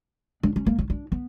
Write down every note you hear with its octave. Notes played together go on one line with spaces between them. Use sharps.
D4
C#4
A#3
C#4
D4
B3